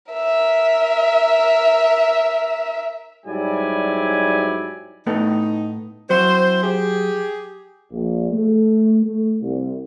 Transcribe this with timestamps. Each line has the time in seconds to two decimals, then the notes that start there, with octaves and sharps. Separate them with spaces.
0.12 A#4 E5
3.26 G#2 F#3 G3 E4 D5 G#5
5.07 A2 A3 B3 D#4
6.10 F#3 C4 E4 C5
6.63 G4 G#4
7.91 A#1
8.32 A3
9.02 A3
9.41 C2